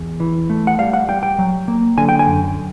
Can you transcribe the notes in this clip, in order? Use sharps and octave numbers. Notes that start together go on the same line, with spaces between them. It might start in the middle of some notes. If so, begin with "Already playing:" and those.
Already playing: E2
E3
A3
F#5
G3 F5
F#5
G3 G5
G5
F#3
A#3
D3 G#5
G5
G#5
F#2